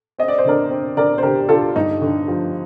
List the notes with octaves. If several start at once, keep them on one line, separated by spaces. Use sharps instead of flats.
C4 D#5
D5
C5
D3 A#4 D5
C4
D3 A#4 D5
C5
D3 G4 A#4
D3 F4 A4
G2 D#4
D3
F3